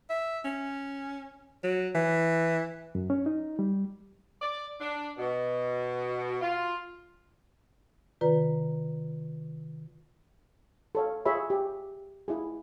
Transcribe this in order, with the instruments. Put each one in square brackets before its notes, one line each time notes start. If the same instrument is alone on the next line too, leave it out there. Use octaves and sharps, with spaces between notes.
[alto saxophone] E5
C#4
F#3
E3
[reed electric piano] F#2
C#4
D#4
G3
[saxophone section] D5
D4
B2
F4
[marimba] C3 D#3 F4 B4 D5 A#5
[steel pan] A4 C#5 F5
F4 G#4 C#5 E5 B5
G4
E4 F4 G#4